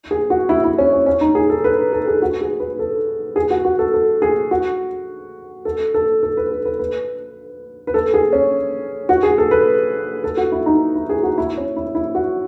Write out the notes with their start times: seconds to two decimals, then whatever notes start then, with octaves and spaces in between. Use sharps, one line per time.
0.11 G#4
0.30 F#4
0.49 E4
0.64 E4
0.78 C#4
0.93 C#4
1.06 C#4
1.21 D#4
1.35 G#4
1.50 A4
1.64 B4
1.93 A4
2.07 G#4
2.22 F#4
2.41 G#4
2.60 B4
2.79 A4
3.36 G#4
3.50 F#4
3.65 F#4
3.79 A4
3.94 A4
4.22 G#4
4.51 F#4
5.65 A4
5.94 A4
6.23 A4
6.37 B4
6.51 A4
6.65 B4
6.79 B4
7.87 B4
7.94 A4
8.14 G#4
8.33 C#4
9.09 F#4
9.23 G#4
9.38 A4
9.51 B4
10.24 A4
10.37 F#4
10.52 E4
10.66 D#4
10.95 E4
11.09 G#4
11.23 F#4
11.38 E4
11.57 C#4
11.76 E4
11.95 E4
12.15 F#4